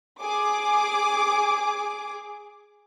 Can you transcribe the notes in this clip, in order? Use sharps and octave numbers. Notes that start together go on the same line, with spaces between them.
G#4 D6